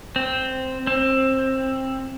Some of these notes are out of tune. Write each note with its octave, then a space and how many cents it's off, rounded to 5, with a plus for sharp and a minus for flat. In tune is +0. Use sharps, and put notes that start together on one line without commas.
C4 -5
C4 +20